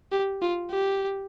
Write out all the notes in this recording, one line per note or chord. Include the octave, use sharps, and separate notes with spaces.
G4
F4
G4